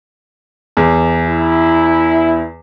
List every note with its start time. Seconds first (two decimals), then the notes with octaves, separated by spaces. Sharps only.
0.77 E2
1.27 E4